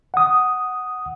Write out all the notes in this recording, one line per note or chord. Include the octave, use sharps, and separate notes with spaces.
F#5 D#6